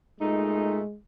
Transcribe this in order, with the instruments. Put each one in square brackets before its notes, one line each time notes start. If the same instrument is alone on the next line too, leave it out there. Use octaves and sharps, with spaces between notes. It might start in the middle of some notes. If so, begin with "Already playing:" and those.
[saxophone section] A#2 A3 D#4 [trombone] G#3